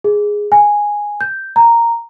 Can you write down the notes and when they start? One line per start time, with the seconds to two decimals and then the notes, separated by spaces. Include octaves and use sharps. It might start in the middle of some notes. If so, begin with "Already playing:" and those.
0.04 G#4
0.52 G#5
1.21 G6
1.56 A#5